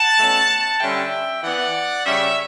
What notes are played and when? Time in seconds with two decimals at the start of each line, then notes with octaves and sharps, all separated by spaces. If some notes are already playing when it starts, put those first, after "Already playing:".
Already playing: F#5 A5
0.18 B2 A3 C#4
0.80 D3 G3 C#4 E5 G5
1.43 E3 B3 D5 F#5
2.06 C#3 G3 C#4 C#5 E5